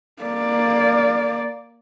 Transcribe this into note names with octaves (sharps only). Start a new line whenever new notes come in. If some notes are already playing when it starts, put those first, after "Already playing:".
A#3 D5